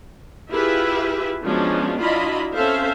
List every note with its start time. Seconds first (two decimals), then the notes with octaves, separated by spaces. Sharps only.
0.50 E4 F4 G4 G#4 B4 E5
1.43 F3 F#3 G#3 B3 C#4 D4
2.00 F#3 D4 E4 F4 D#5 B5
2.54 C4 C#4 A4 C5 E5 F5